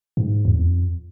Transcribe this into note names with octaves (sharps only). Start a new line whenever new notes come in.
G#2
E2
F2